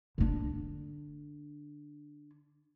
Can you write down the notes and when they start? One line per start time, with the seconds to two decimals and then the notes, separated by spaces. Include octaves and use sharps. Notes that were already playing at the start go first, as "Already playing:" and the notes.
0.18 D3 D4